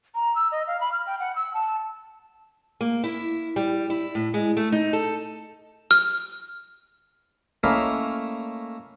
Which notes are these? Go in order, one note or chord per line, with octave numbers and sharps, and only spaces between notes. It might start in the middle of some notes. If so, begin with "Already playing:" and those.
A#5
E6
D#5
F5
B5
F6
G5
F#5
E6
A5
A#3
E4
G3
E4
A2
G#3
A3
D#4
A4
F6
A3 A#3 C#4 E4 A#4 D#5